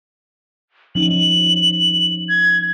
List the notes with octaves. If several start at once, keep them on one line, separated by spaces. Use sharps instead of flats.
F3 C#4 D#4 F#7
G#6